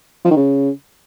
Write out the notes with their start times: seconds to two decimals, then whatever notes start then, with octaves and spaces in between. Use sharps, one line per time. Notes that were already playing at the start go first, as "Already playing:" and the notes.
0.24 F3
0.30 D#3
0.36 C#3